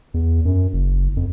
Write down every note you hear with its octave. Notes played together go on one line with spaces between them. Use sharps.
E2
F#2
F#1
F2